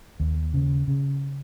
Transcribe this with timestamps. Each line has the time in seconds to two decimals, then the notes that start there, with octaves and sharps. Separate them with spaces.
0.20 D#2
0.54 C#3
0.88 C#3